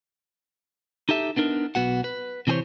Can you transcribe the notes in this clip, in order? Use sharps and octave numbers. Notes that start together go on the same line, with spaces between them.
D#4 G4 A4 E5
B3 D4 D#4 A#4
B1 B3 F#4 F#5
B4
C3 E3 D4 G#4 C5 C#5